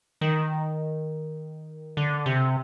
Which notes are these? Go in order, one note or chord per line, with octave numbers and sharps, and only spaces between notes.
D#3
D3
C3